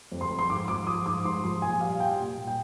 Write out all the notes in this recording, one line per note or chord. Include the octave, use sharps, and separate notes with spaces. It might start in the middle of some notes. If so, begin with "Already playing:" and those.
F2
C6
F2
C6
G#2 D6
F3 D6
F3 D#6
G#2 D6
G#2 C6
F3 C6
A#2 G#5
G3 F5
G3 G5
A#2
A#2
G5